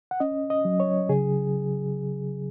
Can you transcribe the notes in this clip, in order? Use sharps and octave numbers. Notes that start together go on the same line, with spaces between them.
F#5
C#4 D#5
D#5
F#3
C#5
C#3 G#4